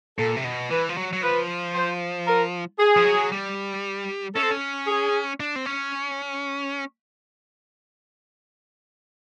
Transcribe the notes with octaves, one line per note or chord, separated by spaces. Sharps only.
A#2 A4
C3
B2
E3 B4
F3
F#3
F#3
F3 B4
C5
A#4
G#4
F3
F#3
G3
C#4 A4
C4
C#4
G#4
D4
C4
C#4